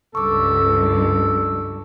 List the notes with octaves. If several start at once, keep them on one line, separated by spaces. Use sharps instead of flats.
C#2 G2 A4 C#6 D6